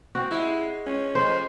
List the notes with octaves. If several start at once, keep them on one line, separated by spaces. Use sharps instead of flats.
C4 F#4
G#3 E4
C#4
F2 C5